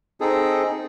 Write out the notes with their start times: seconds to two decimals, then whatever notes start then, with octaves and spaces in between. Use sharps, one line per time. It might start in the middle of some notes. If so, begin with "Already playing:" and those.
0.21 C4 D#4 G#4 A4